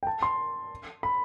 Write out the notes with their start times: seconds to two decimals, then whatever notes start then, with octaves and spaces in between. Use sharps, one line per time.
0.03 G5
0.07 A5
0.22 C6
1.03 B5